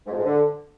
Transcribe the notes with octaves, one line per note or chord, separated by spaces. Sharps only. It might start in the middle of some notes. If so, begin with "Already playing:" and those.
G#2
F2
G#2
D3